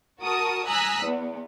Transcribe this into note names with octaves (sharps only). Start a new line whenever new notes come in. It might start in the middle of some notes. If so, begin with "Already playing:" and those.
F#4 A#4 A5 D#6
G#5 A#5 D#6 E6 F#6 B6
E2 B3